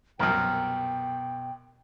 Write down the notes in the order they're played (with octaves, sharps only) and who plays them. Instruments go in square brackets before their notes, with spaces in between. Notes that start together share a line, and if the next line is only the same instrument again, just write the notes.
[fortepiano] C2 F#2 [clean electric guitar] B2 A#4 [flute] G5